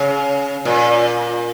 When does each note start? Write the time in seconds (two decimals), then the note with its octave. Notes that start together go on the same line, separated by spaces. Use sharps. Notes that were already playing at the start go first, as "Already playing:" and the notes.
Already playing: C#3
0.65 A#2